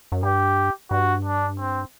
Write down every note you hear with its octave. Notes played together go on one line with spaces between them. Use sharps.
F#2
G2 G4
G2 F#4
D4
C4